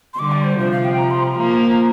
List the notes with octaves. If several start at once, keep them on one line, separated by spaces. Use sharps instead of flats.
C6
D3 G3 D6
D5
C5
C3 F3 C5
F5
G5
A#5
C6
A#5
F3 A#3